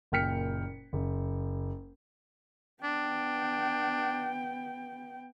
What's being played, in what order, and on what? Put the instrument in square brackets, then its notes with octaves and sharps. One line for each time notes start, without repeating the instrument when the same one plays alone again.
[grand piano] F#1 A#2 G5 F6 B6 C#7
F#1
[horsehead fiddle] B3 G5 [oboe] D4